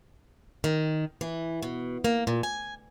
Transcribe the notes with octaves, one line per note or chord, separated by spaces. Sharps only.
D#3
E3
B2
A#3
A#2
G#5